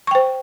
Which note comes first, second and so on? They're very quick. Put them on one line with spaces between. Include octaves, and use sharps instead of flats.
C#6 G5 C5